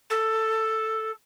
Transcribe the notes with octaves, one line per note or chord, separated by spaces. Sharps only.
A4